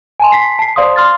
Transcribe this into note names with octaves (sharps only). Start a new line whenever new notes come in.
G#5 A5 C6
B6 C7
A5 C7
C5 D5 F5 C6 D#6
C6 F6 A6